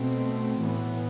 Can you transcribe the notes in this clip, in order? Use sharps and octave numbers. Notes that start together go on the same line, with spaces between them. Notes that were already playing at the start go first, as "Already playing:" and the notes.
Already playing: B2 A3 C4
A2 E3 B3